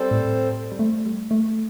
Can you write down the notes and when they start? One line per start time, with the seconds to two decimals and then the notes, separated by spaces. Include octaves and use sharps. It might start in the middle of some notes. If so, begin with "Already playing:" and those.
Already playing: G3 C4 A4 C5
0.11 A2
0.72 G3
0.79 A3
1.06 G3
1.31 A3